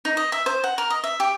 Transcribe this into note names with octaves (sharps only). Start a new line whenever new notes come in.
D#4
D#5
E5
C5
F#5
A#4
D#5
E5
G4